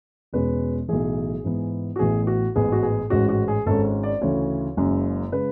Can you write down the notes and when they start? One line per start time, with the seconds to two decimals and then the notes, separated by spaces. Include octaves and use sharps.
0.33 E1 E2 B2 G#3 C#4 B4
0.88 B1 A2 E3 G#4
1.44 G#2 E3 B3
1.96 F#4
1.99 A1 A2 E3 B3 G#4
2.27 F#4
2.55 A1 G#2 G#3 B3 G#4
2.72 F#4
2.83 G#4
3.10 A1 G#2 G#3 C#4 F#4
3.29 F#4
3.48 G#4
3.66 G#1 G#2 G#3 C#4 A4
4.03 D5
4.21 D2 C#3 E3 A3 C#5
4.77 F#1 F#2 C#3 G#3
5.32 C#3 G#3 B4